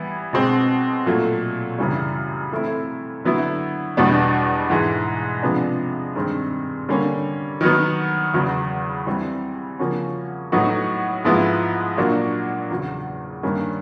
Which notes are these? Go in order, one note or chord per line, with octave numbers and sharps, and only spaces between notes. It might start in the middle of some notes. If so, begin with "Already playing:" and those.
Already playing: E3 G3 B3 E4
B2 G#3 C4
A#2 F#3 A3
F#2 C#3 E3 G3
E3 A3 C4 E4
D3 F#3 B3 E4
E2 B2 G3 B3 D4
G#2 E3 G#3
C3 F3 G#3 B3 D4
G2 D#3 G#3 C4
D3 G3 A#3 C#4
D#3 F#3 B3
E2 C#3 F#3 B3
E3 G3 C4
C#3 F3 A#3 C#4 F#4
A2 F#3 B3 D#4 F#4
G#2 F3 G#3 B3 E4
A#2 F#3 A#3 D4 F#4
E2 C#3 F#3
G2 D#3 G3 A#3 C#4